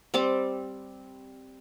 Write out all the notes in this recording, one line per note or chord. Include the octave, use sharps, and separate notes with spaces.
G3 C4 D6